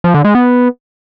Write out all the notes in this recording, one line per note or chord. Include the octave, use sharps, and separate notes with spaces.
F3
D3
G#3
B3